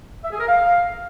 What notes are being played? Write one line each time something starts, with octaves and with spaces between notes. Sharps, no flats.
E5
G#4
A#4
F5